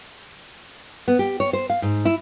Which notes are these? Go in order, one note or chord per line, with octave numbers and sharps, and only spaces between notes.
B3
G4
C#5
C5
F5
G#2
E4